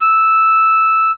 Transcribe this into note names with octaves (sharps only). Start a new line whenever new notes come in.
E6